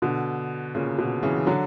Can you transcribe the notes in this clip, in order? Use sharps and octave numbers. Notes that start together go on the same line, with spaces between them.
B2 D3
A#2 C#3
B2
C#3 E3
D3 F#3